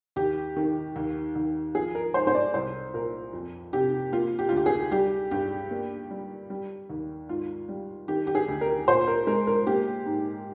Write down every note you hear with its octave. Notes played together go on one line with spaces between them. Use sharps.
D#2 G4
D#3
D#2
D#2
F3 G#4
A#4
G#2 C5
C5
D5
C2 C5
A#2 A#4
F2
C3 G4
A#3 F4
G4
D2 F4
G4
G#4
G3 G4
G2 G4
A#3
G3
G3
D#2
G#2 F4
G3
D#3 G4
G4
G#4
D2
A#4
A#2 C5
A#4
G#3 A#4
A#4
A#3 G4
G#2